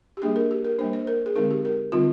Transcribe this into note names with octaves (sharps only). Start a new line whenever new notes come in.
G4
G3 A#3 D4 G#4
A#4
G4
A#4
G3 A#3 D4 C5
C5
A#4
G#4
D3 G#3 C4 D#4 A#4
G4
A#4
D3 G3 C4 D#4 F4